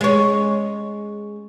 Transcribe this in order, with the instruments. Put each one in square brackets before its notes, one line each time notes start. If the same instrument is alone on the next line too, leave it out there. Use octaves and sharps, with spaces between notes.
[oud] G#3 C#4